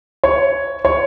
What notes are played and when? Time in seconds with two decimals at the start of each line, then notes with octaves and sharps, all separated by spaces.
0.24 C#5
0.85 C#5